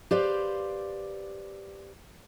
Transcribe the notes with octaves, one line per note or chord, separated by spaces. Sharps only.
G4 B4 C5 D5 F5